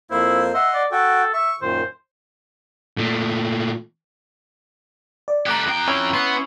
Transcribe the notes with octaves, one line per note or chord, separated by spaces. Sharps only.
F2 A#3 E4 C5
D#5 E5 F#5 C6
D5
F#4 A4 G5
E5 C#6
F#2 A#2 D#3 C5
A#2 A3
D5
A3 G4 A#5 D6 F#6
F2 G5
C#4 E4
B3 C6